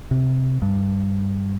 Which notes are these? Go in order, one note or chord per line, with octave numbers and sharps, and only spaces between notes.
C3
G2